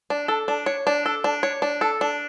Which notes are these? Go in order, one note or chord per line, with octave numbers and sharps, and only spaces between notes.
D4
A4
D4
C#5
D4
A4
D4
C#5
D4
A4
D4